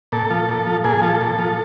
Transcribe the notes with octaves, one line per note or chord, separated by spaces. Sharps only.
A#2 A4
F3
A#2
F3
A#2 G#4
F3 A4
A#2
F3